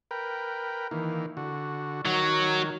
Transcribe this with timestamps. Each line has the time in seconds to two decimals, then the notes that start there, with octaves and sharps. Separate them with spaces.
0.11 A#4 B4 G5
0.91 D#3 E3 A#3
1.37 D3 F#4
2.05 D#3 F#3